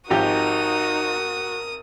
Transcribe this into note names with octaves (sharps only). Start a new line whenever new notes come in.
G#1 F3 D#4 F#4 G4 A#4 D#6